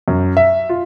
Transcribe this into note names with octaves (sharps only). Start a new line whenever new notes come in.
F#2
E5
F4